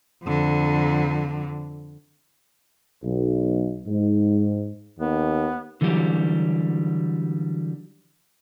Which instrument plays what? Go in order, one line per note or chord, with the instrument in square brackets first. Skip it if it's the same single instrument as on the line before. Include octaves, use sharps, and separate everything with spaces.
[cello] F2 D3
[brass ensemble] B1
G#2
[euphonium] D#2 [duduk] B3
[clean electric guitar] D3 E3 F#3 G3 G4